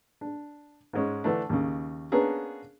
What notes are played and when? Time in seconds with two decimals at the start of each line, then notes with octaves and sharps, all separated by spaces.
0.21 D4
0.93 G#2 G#3 C#4
1.24 D3 E3 A3 D4
1.50 D#2 C#3
2.12 A#3 B3 C#4 D4 G#4 A#4